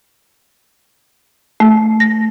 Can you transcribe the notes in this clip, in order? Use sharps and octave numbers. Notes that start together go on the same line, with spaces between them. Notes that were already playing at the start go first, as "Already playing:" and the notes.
A3
A#6